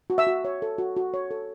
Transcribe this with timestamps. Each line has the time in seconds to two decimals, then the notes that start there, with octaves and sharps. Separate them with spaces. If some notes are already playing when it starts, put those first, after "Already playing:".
0.10 F#4
0.18 E5 E6
0.27 F#4
0.45 C#5
0.62 A4
0.78 F#4
0.96 F#4
1.14 C#5
1.31 A4